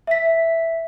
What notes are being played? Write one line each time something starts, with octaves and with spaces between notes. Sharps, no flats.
E5 B6